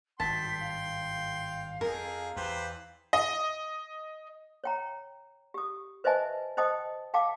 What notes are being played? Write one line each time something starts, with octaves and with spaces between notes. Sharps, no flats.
G#1 G2 G5 A5 C6 B6
F5
F2 G#4 A#4
E2 G4 B4 C5
D#5
C#5 G5 A#5
G4 D#6
B4 C5 D#5 E5 G#5 A5
C5 D#5 G5 A5 D#6
F5 G5 A5 D6